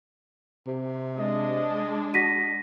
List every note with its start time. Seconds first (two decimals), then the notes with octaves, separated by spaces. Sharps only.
0.67 C3
1.17 G#3 D4 D#5
2.14 F#4 A#6 B6 D#7